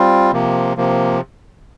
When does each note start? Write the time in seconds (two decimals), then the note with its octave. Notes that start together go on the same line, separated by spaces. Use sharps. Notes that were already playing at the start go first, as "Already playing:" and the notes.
Already playing: G3 C4 F4
0.32 C3 F3 A#3
0.77 C3 F3 A#3